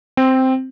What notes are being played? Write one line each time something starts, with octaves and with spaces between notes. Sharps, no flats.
C4